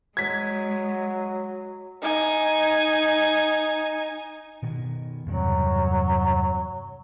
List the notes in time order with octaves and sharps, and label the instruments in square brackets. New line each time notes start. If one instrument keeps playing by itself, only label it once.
[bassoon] F#3 [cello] G#3 [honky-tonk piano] G#6 B6
[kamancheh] D#4 G#5
[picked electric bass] B2 D#3
[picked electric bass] E2 G2 C3 [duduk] F#3